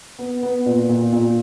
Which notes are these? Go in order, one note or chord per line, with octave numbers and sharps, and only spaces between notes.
B3
B3
A#2
A#2
A#2